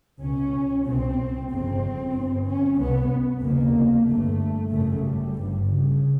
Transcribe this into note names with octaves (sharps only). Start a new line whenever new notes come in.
C#2 B2 C#4
C2 B2 C4
G1 F2 C#3 C4
G1 G2
C#4
C2 C3 B3
F1 D#2 C#3 A#3
G1 G2 A3
G#1 F#2 C#3 A3
G3
G1 G2
C#3